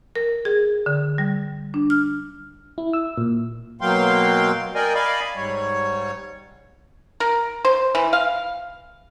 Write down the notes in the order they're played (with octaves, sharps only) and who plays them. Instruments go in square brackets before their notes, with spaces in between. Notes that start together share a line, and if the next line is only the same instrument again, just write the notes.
[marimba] A#4
G#4
D3
G3
D4
F6
[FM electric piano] E4
E6
A#2
[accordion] B2 F#3 A#3 F5 G5 C6
A#4 D5 D#5 G5 G#5
D5 D#5 F5 G#5 B5
G#2 G3 C#5
[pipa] A#4
C5
E3
F5